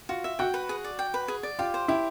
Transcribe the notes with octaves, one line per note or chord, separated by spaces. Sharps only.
F4 F#4
E5
F#4 G5
B4
G#4
D5
G5
B4
G#4
D5
F4 G4
C5
E4 G4